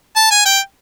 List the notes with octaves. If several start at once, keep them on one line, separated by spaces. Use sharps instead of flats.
A5
G#5
G5